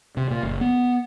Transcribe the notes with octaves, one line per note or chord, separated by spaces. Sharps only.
C3
A#2
F#1
B3